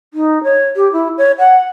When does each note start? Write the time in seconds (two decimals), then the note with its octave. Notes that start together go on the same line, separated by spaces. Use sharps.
0.14 D#4
0.44 C#5
0.76 G4
0.92 E4
1.18 C#5
1.39 F#5